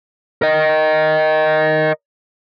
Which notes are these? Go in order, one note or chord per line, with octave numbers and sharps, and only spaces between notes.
A#4 D#5